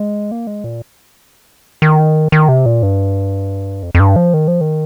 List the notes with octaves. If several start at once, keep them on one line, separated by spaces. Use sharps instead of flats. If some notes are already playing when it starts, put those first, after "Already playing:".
Already playing: G#3
A#3
G#3
A#2
D#3
D#3
C3
A#2
G2
F2
F2
G2
F3
D#3
F3
D#3